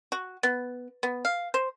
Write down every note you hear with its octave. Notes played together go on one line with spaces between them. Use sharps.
F#4
B3
B3
F5
C5